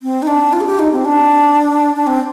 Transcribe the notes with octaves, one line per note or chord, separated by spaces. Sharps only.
C4
D#4
D4
F4
G#4
G4
D#4
C4
D4
D4
C4